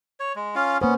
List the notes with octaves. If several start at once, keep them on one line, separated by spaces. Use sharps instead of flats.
C#5
G#3
C#4 F4 F5
A#3 B3 C#4 C5